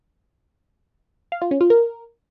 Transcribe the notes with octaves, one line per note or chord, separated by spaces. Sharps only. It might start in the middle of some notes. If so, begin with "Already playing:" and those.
F5
F4
C#4
F4
A#4